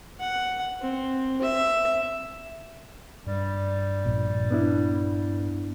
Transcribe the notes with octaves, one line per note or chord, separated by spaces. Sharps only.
F#5
C4
E5
G2 G3
A#1 A#2
B3 D4 E4